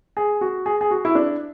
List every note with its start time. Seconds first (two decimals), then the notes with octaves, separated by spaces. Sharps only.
0.17 G#4
0.41 F#4
0.66 G#4
0.81 G#4
0.91 F#4
1.05 E4
1.15 D4